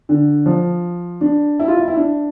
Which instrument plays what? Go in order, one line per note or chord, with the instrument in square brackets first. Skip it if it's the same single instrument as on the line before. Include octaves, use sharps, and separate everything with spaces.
[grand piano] D3
F3
D4
E4
F4
E4
E4
D4